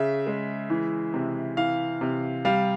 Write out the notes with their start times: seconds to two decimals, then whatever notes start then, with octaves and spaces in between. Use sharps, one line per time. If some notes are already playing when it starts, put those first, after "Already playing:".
Already playing: C#3 E5
0.27 G#3
0.70 E3
1.14 C3
1.57 E3 F5
2.01 C3
2.45 G3 F5